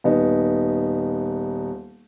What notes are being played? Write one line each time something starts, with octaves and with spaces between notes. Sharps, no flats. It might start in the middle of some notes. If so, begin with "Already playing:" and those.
D#1 B3 D#4